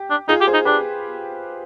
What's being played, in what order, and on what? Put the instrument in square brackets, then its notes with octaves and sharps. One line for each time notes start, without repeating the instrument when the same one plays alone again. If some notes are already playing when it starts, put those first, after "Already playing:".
Already playing: [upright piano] G4
[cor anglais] D4
[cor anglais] D#4 [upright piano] F4 G#4
[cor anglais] G4
[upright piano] G#4 C5
[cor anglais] D#4
[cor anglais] D4 [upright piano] G4 B4